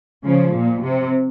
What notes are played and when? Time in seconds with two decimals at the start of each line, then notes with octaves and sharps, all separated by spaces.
0.23 C#3 F3
0.53 A#2
0.82 C3